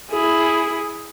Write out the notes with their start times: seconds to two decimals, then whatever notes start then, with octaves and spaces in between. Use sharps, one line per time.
0.10 E4 G#4